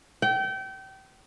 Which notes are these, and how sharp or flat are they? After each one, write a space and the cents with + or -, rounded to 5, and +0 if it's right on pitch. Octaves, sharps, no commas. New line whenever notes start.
G5 -30